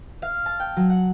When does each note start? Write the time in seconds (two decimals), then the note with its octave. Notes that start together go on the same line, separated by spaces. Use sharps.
0.22 F5
0.46 A5
0.60 G5
0.76 F#3
0.90 F#5